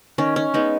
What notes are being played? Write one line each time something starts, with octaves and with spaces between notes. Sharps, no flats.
D#3 C#4
C#4
G#3 B3 D#4